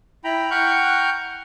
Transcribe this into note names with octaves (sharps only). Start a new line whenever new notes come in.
E4 G5 A#5 B5
F#5 G5 A#5 C#6 F6 G6